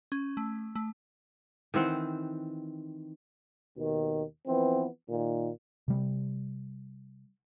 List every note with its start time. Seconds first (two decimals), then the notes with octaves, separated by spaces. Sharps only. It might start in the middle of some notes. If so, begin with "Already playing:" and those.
0.12 C#4
0.37 A3
0.75 A3
1.74 D#3 E3 C4 F#5
3.76 D#2 B2 D#3
4.46 E3 F3 B3 C4
5.09 A#2 D#3
5.88 C3 G3